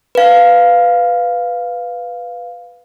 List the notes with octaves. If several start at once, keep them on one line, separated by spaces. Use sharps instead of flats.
B4 F5